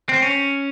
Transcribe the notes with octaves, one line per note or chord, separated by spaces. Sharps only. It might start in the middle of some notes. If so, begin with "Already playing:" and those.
C4
C#4